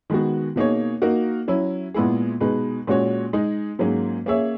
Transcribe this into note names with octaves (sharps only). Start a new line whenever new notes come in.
D#3 G#3 B3 F#4
B2 A#3 D#4 G#4 C#5
A#3 D#4 F#4 A#4
F#3 C#4 E4
A#2 G#3 B3 E4 G#4
B2 G#3 D#4 G#4 B4
A#2 G#3 C#4 F#4 C#5
G#3 D#4 G#4
G#2 F#3 A#3 C#4 G#4
A#3 C#4 G#4 C#5 E5